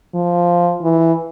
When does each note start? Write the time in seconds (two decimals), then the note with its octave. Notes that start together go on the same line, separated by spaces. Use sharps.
0.15 F3
0.82 E3